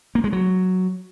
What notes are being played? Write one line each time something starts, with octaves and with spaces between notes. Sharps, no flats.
A#3
G#3
F#3